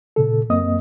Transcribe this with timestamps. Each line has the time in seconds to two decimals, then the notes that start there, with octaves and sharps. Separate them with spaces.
0.16 A#2 C#3 A4
0.50 F#2 A#3 C4 D#5 D#6